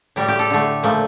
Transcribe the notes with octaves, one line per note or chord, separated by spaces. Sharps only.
A2 G3 G4
G4
A4
D3 A3
A#2 F3 A3